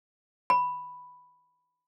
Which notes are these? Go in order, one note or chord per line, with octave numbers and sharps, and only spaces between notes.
B5